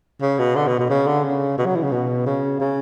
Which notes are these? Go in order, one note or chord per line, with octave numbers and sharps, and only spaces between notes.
C#3
B2
D3
B2
B2
C#3
D3
C#3
B2
F#3
E3
C#3
B2
C#3
C#3